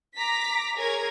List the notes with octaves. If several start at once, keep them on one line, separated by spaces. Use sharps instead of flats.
A#5 D6 A#6 B6
G#4 A#4 C#5 G#6 A#6